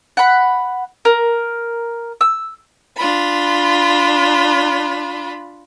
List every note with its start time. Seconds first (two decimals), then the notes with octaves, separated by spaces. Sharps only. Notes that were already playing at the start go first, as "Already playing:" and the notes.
0.17 F#5 B5
1.05 A#4
2.21 E6
2.96 D4 F4 B5